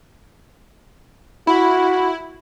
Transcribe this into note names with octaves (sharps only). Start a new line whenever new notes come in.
E4 F#4 B5